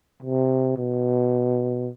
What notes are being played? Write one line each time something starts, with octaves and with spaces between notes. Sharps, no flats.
C3
B2